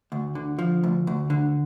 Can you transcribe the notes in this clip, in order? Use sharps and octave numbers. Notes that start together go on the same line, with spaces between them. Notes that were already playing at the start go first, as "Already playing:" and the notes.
D2
D3
F3
D2
D2
D3